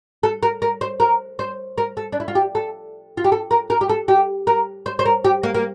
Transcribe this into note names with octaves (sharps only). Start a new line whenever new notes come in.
A4
A#4
A#4
C5
A#4
C5
A#4
A4
D4
E4
F4
G4
A4
F4
G4
A4
A#4
A#4
G4
A4
G4
A#4
C5
C5
A#4
G4
A#3
A#3